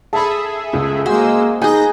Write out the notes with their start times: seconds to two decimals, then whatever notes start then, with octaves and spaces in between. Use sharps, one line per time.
0.13 G#4 A4 E5 A5 B5
0.73 C#2 C#3
1.06 G#3 A#3 F#4 G#4 C5 E6
1.62 D#4 G#4 B4 G#5 G6 A#6